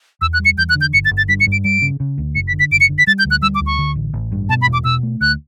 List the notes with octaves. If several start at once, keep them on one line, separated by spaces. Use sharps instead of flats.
E2 E6
F#6
G3
C#7
E2 G6
F#6
D3
G6
G1 C#7
A6
G1
A6
G2 B6
C#7
G2
D7
G3 D7
C#3
C#3
D2
F#1 C#7
B6
D3
B6
F#1 D7
C#7
D3
B6
G3 A6
G6
D2
F#6
G3 E6
D6
D2
C#6
D3
A1
A1
G2
B2 A5
B5
E1
D6
B2 E6
A3
D2 F#6